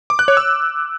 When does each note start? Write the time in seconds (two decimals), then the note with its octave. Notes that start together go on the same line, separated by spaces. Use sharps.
0.10 D6
0.19 F#6
0.28 C#5
0.37 E6